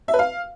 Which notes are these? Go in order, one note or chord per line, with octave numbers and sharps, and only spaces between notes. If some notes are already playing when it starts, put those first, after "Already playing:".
E5
B4
F5